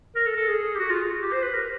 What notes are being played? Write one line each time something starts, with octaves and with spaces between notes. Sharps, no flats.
A#4
A4
A4
G#4
G4
F#4
F4
G4
C5
B4
A#4